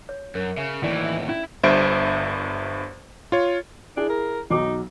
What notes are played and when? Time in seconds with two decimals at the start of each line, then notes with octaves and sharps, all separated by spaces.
0.09 C#5
0.35 F#2 A#4
0.57 C#3 E5
0.84 D#2 A2 E3 D5
1.05 E5
1.29 C#4 E4
1.63 G1 G2 C5 E5 D7
3.32 F4 C#5
3.97 D4 E4 G#4
4.09 A#4
4.50 B1 F#3 D#4 D6